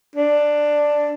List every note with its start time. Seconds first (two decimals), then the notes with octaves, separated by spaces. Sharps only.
0.16 D4